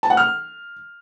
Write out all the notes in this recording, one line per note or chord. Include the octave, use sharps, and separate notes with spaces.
A5
F#5
F6